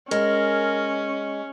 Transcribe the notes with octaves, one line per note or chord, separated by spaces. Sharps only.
G#3 C#4 A#4